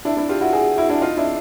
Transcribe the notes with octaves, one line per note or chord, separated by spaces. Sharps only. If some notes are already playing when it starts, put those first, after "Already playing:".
D4 E4
D4 E4
F4 G4
E4 F#4
F#4 G#4
E4 F#4
D4 E4
D#4 F4
D4 E4